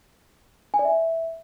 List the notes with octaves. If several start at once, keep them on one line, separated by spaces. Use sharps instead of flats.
G#5
D5
E5